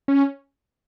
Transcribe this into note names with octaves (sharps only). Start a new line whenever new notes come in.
C#4